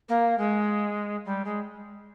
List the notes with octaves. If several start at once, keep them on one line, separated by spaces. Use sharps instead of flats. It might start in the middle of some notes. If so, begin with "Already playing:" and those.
A#3
G#3
G3
G#3